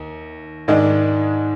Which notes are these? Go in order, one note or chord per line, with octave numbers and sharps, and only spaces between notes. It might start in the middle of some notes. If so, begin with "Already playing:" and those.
Already playing: D#2
G#2 D#3 G#3 D4